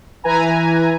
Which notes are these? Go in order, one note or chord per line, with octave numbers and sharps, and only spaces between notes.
E3 E4 B4 G#5 A#5